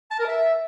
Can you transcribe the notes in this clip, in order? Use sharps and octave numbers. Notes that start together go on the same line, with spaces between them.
A5
A#4
E5